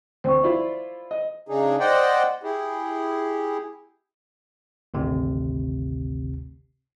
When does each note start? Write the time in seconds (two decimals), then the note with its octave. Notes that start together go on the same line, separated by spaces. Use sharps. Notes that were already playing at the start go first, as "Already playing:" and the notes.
0.24 D2 C4 C5 C#6
0.44 E4 F4 D5
1.11 D#5
1.48 C#3 D4 D#4 G#4
1.80 C5 D5 D#5 F#5 G5
2.43 E4 G4 G#4
4.94 G#1 D2 C3